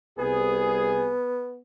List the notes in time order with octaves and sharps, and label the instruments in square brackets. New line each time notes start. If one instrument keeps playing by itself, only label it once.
[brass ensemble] C2 G#4 [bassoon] B3